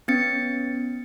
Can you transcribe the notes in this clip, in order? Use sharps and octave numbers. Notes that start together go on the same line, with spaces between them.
B3 C#4 A6 C#7